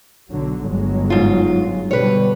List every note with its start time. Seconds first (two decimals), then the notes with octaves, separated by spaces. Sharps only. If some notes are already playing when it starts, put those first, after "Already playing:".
0.31 B1 D3 F#3
0.67 G1 F#3 G#3
1.10 G#2 F4
1.91 B2 D3 G3 B4 C#5